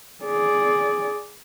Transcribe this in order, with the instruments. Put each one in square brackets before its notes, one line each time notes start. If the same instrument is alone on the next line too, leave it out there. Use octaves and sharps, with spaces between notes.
[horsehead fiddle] G#4 D5